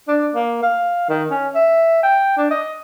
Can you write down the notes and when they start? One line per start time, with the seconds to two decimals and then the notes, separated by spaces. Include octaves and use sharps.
0.08 D4
0.34 A#3
0.63 F5
1.09 D#3
1.31 C#4
1.55 E5
2.03 G5
2.37 D4
2.51 D#5